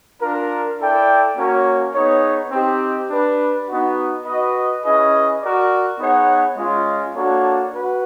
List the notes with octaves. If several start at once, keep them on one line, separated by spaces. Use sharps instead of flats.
D4 F4 A#4
E4 A4 D5 G5
A#3 C#4 F#4 A#4 C#5
B3 D#4 G#4 C#5
C4 D#4 G4
D4 G4 B4
B3 D#4 F#4
F#4 B4 D#5
C#4 E4 G#4 B4 D#5
F#4 A#4 D5
B3 D#4 G#4 C#5 F#5
G#3 C#4 F4
A#3 D4 F#4 A4 C#5
F#4 B4